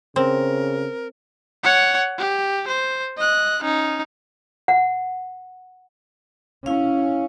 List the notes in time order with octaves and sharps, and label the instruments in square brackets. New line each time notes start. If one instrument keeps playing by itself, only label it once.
[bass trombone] C#3 [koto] C4 [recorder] A#4
[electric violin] C#5 F#5
G4
C5
D#5 F#6
C#4 D#4
[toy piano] F#5
[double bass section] C#4 [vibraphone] E4 F5